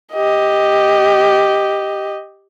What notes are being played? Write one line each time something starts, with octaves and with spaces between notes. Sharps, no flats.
G4 D#5